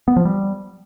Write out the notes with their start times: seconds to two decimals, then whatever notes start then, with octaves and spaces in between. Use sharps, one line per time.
0.08 B3
0.16 F3
0.25 G3